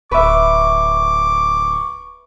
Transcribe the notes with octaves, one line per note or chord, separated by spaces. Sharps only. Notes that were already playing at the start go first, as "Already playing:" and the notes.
D1 B4 E5 C#6 D6